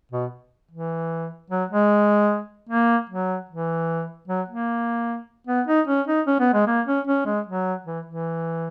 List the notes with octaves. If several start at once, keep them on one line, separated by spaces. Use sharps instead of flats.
B2
E3
F#3
G#3
A#3
F#3
E3
F#3
A#3
B3
D#4
C#4
D#4
C#4
B3
G#3
A#3
C#4
C#4
G#3
F#3
E3
E3